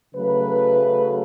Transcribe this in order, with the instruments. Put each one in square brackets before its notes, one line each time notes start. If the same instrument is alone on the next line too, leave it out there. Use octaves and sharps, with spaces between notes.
[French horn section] C#3 F#3 A3 B4